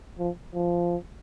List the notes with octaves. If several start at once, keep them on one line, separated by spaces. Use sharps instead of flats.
F3
F3